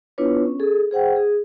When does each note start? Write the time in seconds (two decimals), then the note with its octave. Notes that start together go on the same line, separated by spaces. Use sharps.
0.18 B3 D4 E4 F4 B4 C#5
0.46 C#4
0.60 G#4 A4
0.91 G#4 C5 F#5 G5
1.16 G#4